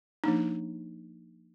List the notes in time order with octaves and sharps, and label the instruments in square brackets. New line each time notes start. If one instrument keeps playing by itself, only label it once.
[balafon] F3 A#3 D4 D#4